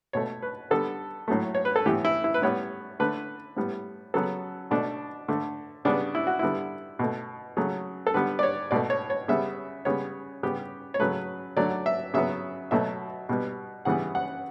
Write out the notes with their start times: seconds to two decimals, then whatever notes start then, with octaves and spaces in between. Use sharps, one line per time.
0.13 B2 A3 C#5
0.42 B4
0.71 D3 G3 B3 A4
1.28 A2 F#3 A3
1.55 C#5
1.65 B4
1.76 A4
1.86 A2 E3 B3 G4
2.05 E4
2.24 E4
2.34 B4
2.42 A2 G3 B3 C#5
3.00 D3 A3 B4
3.57 A2 G3 B3
4.14 C#3 F#3 B3 A4
4.71 B2 A3 D4
5.28 D3 A3
5.85 C#3 G3 B3 D4
6.15 E4
6.27 F#4
6.39 D3 G3 B3 E4
6.99 B2 A3
7.57 C#3 F#3 A3
8.07 A4
8.14 D3 G3 B3 B4
8.39 D5
8.43 C#5
8.71 B2 A3 D5
8.90 C#5
9.10 C#5
9.28 C#3 G3 B3 E5
9.85 C#3 G3 B3 C#5
10.43 C#3 G3 B3 G4
10.94 C#5
11.00 C#3 F#3 A3 B4
11.57 D3 F#3 A3 D5
11.86 E5
12.14 C#3 F#3 B3 E5
12.71 B2 F#3 A3 E5
13.29 B2 G3 B3
13.85 C#3 E3 G3 B3 F#5
14.15 F#5